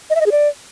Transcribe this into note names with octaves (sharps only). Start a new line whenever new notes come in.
D#5
E5
D#5
G#4
D5